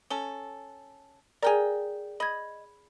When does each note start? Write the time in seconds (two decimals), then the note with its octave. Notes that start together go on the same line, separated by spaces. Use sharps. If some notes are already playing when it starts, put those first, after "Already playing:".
0.10 C#4 A4 G7
1.43 G#4 A#4 D5 G5 G#5
2.20 D#5 B5 G#6